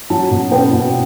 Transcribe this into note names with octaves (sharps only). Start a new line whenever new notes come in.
F#3 A5
B2
B3 G5
B2